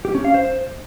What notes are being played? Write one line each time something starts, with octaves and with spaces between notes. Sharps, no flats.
G4
C#4
F5
C5